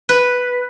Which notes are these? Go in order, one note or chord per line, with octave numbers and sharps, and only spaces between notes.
B4